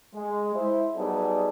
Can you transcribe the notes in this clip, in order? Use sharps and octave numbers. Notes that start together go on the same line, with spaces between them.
G#3
E4 C5
F#3 G3 B3 D#4 G#4 A4